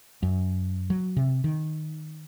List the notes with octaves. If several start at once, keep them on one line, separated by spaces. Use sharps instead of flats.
F#2
F#3
C3
D#3